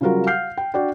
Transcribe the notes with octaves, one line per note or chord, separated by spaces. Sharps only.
C#3 F#3 G3 F4 F#4 A#4
F5 F#5 F6 G6 C7
G5
D4 F#4 D5 G5